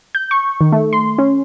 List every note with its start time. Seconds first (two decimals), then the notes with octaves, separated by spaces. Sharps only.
0.15 G6
0.31 C#6
0.61 D#3
0.72 A3
0.93 C6
1.18 C#4